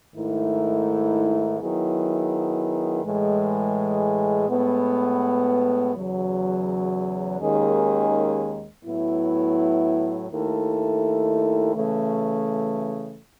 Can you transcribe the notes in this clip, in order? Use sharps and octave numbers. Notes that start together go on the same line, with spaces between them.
G#2 D#3 A3 E4
D#3 F#3 B3 E4 G#4
A2 E3 G#3
A2 G#3 B3
E2 C#3 F#3
D#2 D#3 G#3 C#4 G#4
A2 F#3 B3 E4
D#2 D#3 A3 E4 A4
C#3 E3 A3